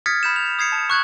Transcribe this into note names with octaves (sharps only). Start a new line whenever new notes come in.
D#6 F6 G#6 A6 B6 C#7
B5 G6 E7
F7
D#6 G#6 C7 C#7
A5
C#6 F#6 G#6 F#7